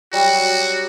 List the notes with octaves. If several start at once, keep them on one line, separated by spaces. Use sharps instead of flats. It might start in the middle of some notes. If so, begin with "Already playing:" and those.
F#3 G3 F#4